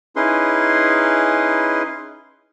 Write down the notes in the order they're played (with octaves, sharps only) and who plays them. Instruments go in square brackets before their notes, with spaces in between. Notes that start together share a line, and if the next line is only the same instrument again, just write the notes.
[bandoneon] C#4 D#4 E4 G#4 B4 C6